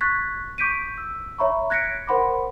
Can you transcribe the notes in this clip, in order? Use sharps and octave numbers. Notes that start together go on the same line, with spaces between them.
C#6 F#6 G#6 A6 B6
C#6 D6 G6 B6 D7 D#7
E6
C#5 E5 A#5 B5 C#6
F#6 G#6 A#6 B6 C#7 D7
A#4 C5 F#5 B5 C6 D6